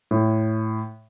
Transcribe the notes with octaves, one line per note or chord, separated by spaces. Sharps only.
A2